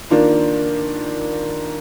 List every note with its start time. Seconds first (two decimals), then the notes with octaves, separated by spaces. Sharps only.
0.10 D#3 A#3 D4 F4